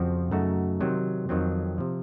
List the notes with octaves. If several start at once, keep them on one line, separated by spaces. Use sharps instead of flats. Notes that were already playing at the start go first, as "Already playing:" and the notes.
Already playing: F2 C#3 F3 C4 F#4
F#2 C#3 A3 D#4 F#4
C3 D#3 F#3 C4
F2 D#3 F#3 C4
C3 F3